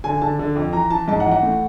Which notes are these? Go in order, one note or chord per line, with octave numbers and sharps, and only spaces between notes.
D3 G#5
D3 A5
D3
F2
E3 A#5
E3 A5
G#2 A5
F#5
E3
F#5
A2